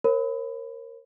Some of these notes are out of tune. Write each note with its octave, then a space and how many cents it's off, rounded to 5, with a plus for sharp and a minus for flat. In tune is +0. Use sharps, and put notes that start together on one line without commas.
A#4 +0 C#5 -45 B5 +25